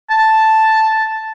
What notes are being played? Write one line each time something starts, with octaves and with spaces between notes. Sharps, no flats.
A5